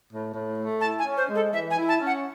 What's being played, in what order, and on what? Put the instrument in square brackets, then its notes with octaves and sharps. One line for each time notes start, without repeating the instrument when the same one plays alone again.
[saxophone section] A2
A2
A3
[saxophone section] E4 [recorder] A5
[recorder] G#5
[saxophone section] C#4
[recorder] C5
[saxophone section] G#3
[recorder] A4
[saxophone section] E3 [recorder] E5
[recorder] G#5
[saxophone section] E4
[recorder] A5
[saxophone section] C#4
[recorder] F#5